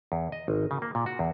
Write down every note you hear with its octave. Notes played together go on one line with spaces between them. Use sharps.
E2
D#5
G#1
C#3
A#3
A#2
F#4
E2